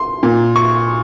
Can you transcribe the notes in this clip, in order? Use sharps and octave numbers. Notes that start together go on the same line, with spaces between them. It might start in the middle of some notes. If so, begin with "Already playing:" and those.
Already playing: C6
A#2
C#6